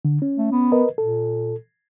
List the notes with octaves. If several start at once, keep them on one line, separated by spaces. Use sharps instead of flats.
D3
C#4
A3
B3
A#4 B4 D#5
A#2 A4